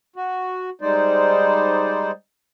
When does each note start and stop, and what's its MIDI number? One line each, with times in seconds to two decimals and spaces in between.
0.16 0.70 66
0.81 2.11 55
0.81 2.11 56
0.81 2.11 63
0.81 2.11 72
0.81 2.11 74